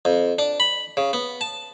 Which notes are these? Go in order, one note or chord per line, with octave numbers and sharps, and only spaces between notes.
F2
D4
B5
C#3
B3
A5